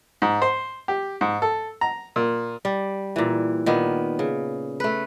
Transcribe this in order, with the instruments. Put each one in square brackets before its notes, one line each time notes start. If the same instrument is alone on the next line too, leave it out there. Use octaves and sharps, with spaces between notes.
[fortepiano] G#2
C5
G4
G#2
A4
A#5
A#2
[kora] G3
A#2 E3
A#2 D#3 B3
C#3
A3 B4